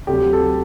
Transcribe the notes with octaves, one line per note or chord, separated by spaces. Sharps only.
D2 C3 F#3 G4
A4